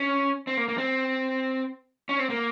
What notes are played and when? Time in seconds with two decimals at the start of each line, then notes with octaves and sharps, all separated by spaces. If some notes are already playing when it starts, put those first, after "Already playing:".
Already playing: C#4
0.47 C4
0.57 A#3
0.68 A#3
0.78 C4
2.09 C#4
2.19 C4
2.30 A#3